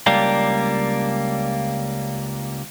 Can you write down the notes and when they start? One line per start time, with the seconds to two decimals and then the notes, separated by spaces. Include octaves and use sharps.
0.06 C#2 G3 A#3 D4